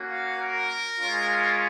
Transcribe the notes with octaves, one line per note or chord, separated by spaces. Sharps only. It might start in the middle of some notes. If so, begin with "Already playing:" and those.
Already playing: A#3 C#4 F#4
F5
A#4
G#3 C#4 F4